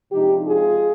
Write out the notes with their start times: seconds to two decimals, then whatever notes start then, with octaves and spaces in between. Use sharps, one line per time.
0.12 C3 F3 G#3 D4 D#4 G4
0.46 F4 G#4